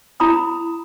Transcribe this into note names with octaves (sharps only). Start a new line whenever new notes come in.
E4 A#5 B5 D#6